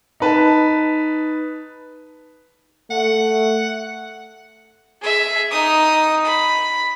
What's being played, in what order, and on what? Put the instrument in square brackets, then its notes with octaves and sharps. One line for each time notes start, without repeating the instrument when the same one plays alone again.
[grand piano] D#4 B4 A5
[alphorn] A3 [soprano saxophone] F#5
[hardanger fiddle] G#4 E5
D#4 D#6
B5